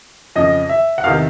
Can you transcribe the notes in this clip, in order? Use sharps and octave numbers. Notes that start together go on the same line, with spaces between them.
F2 C#3 F3 D#5
E5
F#5
E2 C3 D#3 F5